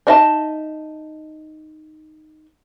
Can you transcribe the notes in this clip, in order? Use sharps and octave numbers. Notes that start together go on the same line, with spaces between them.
D4 D#4 D#5 E5 A5